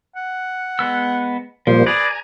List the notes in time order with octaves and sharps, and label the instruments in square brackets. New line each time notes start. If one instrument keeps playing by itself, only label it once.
[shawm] F#5
[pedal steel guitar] G#3 B3 E6
[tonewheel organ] A#2 G3 A#3 [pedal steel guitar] F3 [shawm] C5
[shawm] G#4 [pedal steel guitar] B4 D5 [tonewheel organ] G#5 A#5